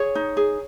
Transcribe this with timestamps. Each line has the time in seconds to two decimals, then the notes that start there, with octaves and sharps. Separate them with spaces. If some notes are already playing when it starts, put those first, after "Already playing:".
Already playing: G#4 C#5
0.15 D#4
0.37 G#4